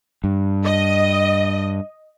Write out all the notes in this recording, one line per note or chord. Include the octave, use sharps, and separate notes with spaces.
G2
D#5